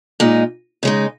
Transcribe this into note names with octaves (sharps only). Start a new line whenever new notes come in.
A#2 G#3 D#4
C#3 G#3 D#4